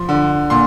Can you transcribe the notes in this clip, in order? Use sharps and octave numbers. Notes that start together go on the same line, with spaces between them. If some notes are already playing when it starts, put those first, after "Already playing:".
Already playing: F3 C6
D3
A#2 C6